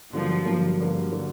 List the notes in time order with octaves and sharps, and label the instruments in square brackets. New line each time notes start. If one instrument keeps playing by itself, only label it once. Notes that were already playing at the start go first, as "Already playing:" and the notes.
[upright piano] G2 D3 F#3 A#3 [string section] F3
[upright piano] G2 D3 F#3 A#3
G2 D3 F#3 A#3
D3 F#3 A#3